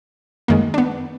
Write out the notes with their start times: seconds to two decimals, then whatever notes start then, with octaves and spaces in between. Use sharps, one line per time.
0.48 F#2 D#3 G#3 A#3
0.74 D4
0.78 B3